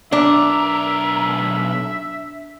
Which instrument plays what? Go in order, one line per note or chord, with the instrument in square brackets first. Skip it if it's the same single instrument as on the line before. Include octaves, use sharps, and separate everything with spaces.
[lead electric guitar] B1 A#4 [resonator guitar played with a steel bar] D4 [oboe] E5